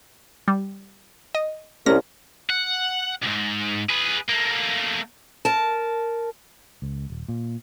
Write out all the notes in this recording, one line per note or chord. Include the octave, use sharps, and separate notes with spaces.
G3
D#5
C2 C#4 A#6
F#5
C2 G#2
G#4 B4
A3 A#3
A#4 A5
C#2
D#1
A#2